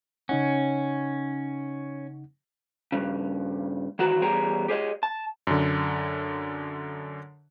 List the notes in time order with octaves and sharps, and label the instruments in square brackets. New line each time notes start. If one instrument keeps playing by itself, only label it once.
[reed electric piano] C#3 D#4 F#5 [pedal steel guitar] C#4
[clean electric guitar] G2 C#3
D#3 E3 F#4 F#5 A#5
E2 G3 G#4 C#5 G5 A#5
G4 G#4 C#5 D#5
A5
[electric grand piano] F#2 D3